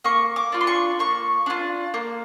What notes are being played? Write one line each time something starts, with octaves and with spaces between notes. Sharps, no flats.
A#3 C#6
D6
D4 F4
C6
C#6
A#3 C#6
D4 F4
A#3